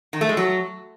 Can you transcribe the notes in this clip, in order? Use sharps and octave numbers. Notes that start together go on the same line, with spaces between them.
D#3
A3
G#3
F#3